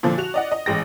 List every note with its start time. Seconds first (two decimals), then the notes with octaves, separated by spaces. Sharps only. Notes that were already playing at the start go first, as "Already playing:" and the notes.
0.03 A#2 D3 F3
0.18 F#4 F7
0.34 D5 D#5 F#5
0.52 D#5
0.66 A1 G#3 G5 A#6